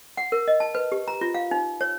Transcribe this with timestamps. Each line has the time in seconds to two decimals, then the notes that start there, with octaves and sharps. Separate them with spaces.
0.17 F#5
0.32 A#4
0.48 D#5
0.60 A5
0.75 B4
0.92 G4
1.08 A#5
1.21 F4
1.34 F5
1.51 D#4
1.81 C#5